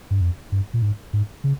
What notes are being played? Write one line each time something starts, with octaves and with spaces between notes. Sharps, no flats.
G2
F2
G2
A#2
G#2
G#2
C#3